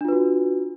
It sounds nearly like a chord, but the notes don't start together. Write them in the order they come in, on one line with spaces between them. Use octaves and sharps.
D4 F4 B4 F#4